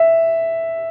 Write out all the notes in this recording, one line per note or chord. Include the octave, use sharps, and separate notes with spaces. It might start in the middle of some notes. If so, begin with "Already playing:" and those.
Already playing: E5